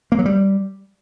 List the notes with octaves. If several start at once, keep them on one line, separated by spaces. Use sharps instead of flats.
A#3
F#3
G3